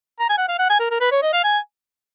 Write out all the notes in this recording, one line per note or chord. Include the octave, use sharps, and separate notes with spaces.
A#5
G#5
F#5
F5
F#5
G#5
A#4
A#4
B4
C#5
D#5
F5
G#5